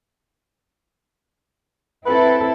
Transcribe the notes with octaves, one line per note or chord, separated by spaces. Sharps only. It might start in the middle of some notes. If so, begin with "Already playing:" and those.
C4 E4 A4 B4